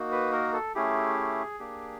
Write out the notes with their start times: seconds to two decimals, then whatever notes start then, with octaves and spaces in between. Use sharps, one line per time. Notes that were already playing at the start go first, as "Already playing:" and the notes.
Already playing: A#3 D#4 F#4
0.12 B4
0.32 A#4
0.53 A4
0.75 A3 C#4 E4 G4 G#4
1.59 A#3 D4 G4